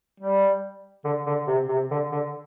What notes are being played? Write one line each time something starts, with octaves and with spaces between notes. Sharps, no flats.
G3
D3
D3
C3
C3
D3
D3